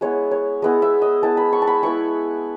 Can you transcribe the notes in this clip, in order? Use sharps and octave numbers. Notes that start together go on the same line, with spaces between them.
G#3 B3 E4 C#5
C#5
G#3 B3 E4 D#5
E5
D#5
G#3 B3 E4 A5
B5
C#6
A5
B5
G#3 B3 E4 C#6